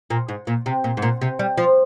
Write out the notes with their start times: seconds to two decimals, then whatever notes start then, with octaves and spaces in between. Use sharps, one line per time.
0.10 A#2
0.29 G#2
0.47 A#2
0.66 C3
0.84 A#2
0.97 G#2
1.02 A#2
1.21 C3
1.39 G3
1.57 F3